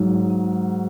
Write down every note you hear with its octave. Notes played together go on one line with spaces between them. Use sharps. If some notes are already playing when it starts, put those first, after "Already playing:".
Already playing: G#2 F#3